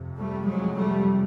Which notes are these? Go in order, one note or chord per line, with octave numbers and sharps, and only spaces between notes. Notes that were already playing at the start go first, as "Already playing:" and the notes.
Already playing: F2 C3
G3 A3
F#3 G#3
G3 A3